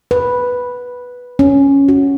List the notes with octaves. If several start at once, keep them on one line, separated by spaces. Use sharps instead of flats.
B4
C#4
F#4